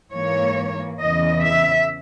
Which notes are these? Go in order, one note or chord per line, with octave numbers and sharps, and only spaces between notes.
G#2 E3 A#3 C#5
E2 C#3 E3 D#5
E5